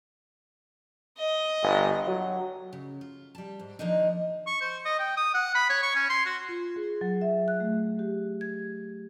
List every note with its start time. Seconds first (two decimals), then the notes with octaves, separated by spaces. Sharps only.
1.17 D#5
1.63 G1
2.07 F#3
2.73 C#3
3.01 F4
3.35 G3 A5
3.60 G#2
3.79 D#3 F3 A#3 D4 D#4
4.47 C#6
4.61 C5
4.85 D#5
4.99 G5
5.17 D#6
5.34 F#5
5.55 B5
5.70 C#5
5.83 C#6
5.95 C#4
6.10 C6
6.26 F#4
6.49 F4
6.76 G#4
7.01 F#3
7.21 E5
7.48 F#6
7.60 A3
7.99 G4
8.41 G#6